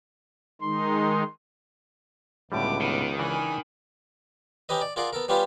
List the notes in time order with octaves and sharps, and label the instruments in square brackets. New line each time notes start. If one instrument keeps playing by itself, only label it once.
[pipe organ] D#3 G#3 D#4 [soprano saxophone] C6
[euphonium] C#2 [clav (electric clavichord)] A2 D3 G3 [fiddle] B3 D6
[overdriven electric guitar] D#3 [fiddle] B3 D6
[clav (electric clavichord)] C#3 E3 D4 [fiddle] G#5 B5
[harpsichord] C#4 D#4 G4 B4 D#5
D5
F4 G#4 A#4 D5 F#5
B3 A4 A#4
G3 B3 C#4 F4 G4 B4